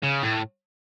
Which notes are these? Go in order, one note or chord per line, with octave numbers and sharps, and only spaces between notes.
C#3
A2